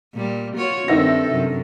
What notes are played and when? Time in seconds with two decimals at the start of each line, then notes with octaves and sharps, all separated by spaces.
0.13 A#2 G3
0.56 F4 F#4 C#5
0.88 G2 D#3 C4 A4 E5 A#6
1.31 F#2 C3